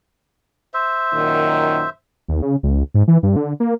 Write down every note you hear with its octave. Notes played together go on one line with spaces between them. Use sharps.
C5 E5
F#2 A#2 D#3
D#2
C#3
C#2
G#2
E3
G2
D3
A#3